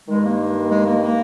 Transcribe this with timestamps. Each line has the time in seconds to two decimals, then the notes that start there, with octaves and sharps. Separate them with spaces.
0.08 G2 D#3 G#3
0.23 A#3
0.69 G#3
0.86 A#3
1.02 A#3